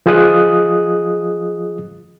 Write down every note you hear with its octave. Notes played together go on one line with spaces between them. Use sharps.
F3 F4 G#4 D#5 D#6 F#6